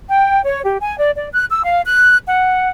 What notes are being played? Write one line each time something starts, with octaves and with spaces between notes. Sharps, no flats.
G5
C#5
G4
G#5
D5
D5
F#6
E6
F5
F#6
F#5